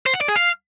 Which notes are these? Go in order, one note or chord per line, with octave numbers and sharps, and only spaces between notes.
C5
F#5
D5
G#4
F5